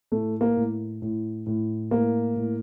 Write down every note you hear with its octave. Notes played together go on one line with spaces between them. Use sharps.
A2 A3
A#3
A2
A2
A2
A2 A#3
A2